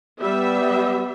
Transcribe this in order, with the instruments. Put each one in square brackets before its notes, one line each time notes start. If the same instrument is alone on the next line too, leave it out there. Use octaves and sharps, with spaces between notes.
[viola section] G3 E5 [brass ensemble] B3